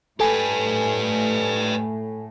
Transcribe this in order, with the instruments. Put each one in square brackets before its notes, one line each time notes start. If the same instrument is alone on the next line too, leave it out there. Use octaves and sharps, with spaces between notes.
[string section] A2 [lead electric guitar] G4 B4 [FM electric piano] A4 G#5